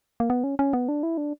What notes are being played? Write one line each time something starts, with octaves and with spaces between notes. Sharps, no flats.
A#3
B3
C#4
C#4
B3
D4
E4
D4